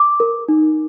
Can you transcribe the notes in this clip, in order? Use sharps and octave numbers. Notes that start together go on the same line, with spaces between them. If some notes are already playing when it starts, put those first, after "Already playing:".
Already playing: D6
A#4
D#4